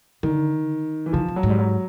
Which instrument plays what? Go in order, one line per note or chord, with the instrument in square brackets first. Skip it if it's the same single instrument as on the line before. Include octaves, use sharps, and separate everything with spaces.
[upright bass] D3 [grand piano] D#3
[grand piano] E3
[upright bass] C#3 [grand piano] F3
[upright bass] C3
[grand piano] F#3
[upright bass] G#2
[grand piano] G3
F#3